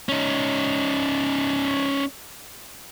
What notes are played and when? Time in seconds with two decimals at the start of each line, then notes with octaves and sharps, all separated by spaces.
0.09 C#4 D#4